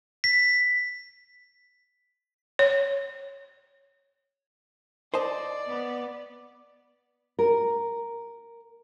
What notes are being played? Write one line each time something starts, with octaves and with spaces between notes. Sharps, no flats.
B6
C#5
C5 D5 D#5 A5
B3
A#4